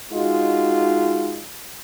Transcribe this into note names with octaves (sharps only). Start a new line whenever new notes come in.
G#3 D#4 F4 F#4